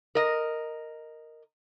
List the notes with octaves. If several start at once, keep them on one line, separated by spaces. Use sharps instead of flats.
A#4 D#5